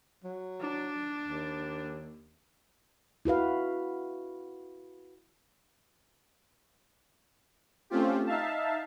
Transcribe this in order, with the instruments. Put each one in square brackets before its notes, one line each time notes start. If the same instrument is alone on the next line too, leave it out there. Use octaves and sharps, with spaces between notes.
[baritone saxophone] F#3
[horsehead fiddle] D4
[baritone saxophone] D#2
[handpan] E4 F#4 B4 F5
[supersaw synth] A3 C4 C#4 F4 G4
D#4 E5 F5 A5